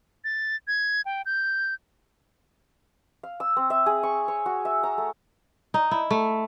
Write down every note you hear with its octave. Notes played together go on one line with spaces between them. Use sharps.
A6
G#6
G5
G6
F5
E6
C4
E5
G#4
C#6
C#5
F#4
E5
A#5
A3
D#4
E4
A3